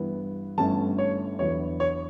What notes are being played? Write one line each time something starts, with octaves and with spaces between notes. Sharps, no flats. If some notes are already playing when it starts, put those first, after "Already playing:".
Already playing: G2 E3 B3
G1 G2 E3 A3 C#4 A5
C#5
E2 D3 F#3 B3 C#5
C#5